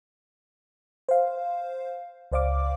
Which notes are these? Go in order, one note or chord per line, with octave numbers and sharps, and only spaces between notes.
C5 F5
C#2 C5 D5 F5 D6